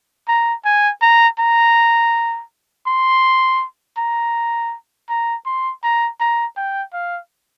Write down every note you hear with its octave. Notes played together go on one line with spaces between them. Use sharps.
A#5
G#5
A#5
A#5
C6
A#5
A#5
C6
A#5
A#5
G5
F5